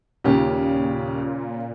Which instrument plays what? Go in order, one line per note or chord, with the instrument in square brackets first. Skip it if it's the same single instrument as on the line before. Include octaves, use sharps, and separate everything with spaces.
[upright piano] D#2 G4 [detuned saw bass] A#2 [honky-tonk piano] C#3